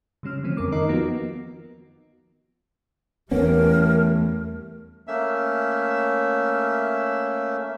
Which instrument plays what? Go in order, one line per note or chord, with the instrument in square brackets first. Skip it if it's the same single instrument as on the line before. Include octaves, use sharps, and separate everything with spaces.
[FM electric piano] C#3 G3 C#4 F6
D3 F3 A3 C4 C#4
F2 B3 A#4 D6 F6
D#3 D#4 A#4 D#5 A#5 C7
F3 A#3 B3 F4 F#4
[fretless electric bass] E2 B3 C#4 [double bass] G3 A3 [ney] A#4
[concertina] A3 A#3 C#4 E5